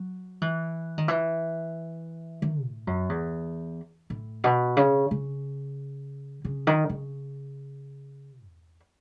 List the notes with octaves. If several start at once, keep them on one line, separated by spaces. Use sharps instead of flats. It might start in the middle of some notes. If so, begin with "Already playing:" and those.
Already playing: F#3
E3
D#3
E3
D#3
A2
F#2
E2
A2
B2
C#3
C#3
C#3
D#3
C#3
E2